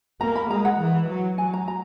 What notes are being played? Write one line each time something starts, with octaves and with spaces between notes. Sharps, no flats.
A#3 A#5
B5
G#3 A#5
F#5
E3
F#3
F#3 G#5
A#5
A#5